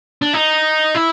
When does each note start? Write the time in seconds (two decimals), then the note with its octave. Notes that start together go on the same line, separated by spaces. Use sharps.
0.22 D4
0.33 D#4
0.95 E4